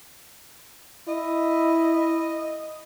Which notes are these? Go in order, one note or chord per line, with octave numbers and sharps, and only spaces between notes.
E4 D#5